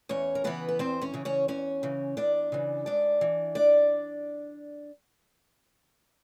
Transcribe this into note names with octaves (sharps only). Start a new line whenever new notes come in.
E2 C#4 C#5
A#4
C#3 E3 B3 B4
B4
E2 C4 C5
C#4 C#5
C#3 E3
C#4 C#5
E2 C#4 C#5
C#3 E3
E2 D4 D5
C#3 E3
G#2 D4 D5
E3
D4 D5